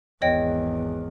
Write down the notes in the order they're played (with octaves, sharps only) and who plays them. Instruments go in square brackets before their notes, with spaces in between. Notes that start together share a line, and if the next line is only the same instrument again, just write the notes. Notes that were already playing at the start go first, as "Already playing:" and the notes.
[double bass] G#1 E2 [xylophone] C#5 D#5 G5